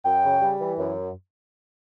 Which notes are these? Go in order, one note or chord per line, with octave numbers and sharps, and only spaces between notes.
F#2 G5
C#3
G3
E3
F#2